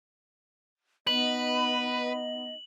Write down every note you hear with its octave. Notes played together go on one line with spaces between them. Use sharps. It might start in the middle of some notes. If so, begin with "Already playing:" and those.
B3 D#4 B4 D#5 F#7